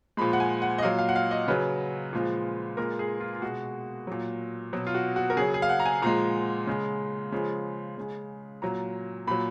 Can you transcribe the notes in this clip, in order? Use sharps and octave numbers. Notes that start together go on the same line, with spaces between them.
A#2 F3 G#3 B5
F#5
G#5
F#5
D#5
A#2 F#3 F5
F5
F#5
F5
D#5
C#3 F#3 B4
A#2 F3 G#3
A#2 G#3 A#4
G#4
F4
F4
B2 G#3 F#4
A#2 F#3
B2 F#3
F4
F#4
F#4
A#4
C#3 F#3 G#4
G#4
F5
F#5
A#5
G#5
A#2 F3 G#3 A#5
C#3 G#3
C#3 F3 G#3
C#3 G#3
A#2 F#3 A#5
A#2 F#3 B5